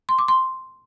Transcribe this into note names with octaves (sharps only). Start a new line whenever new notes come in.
C6
D6
C6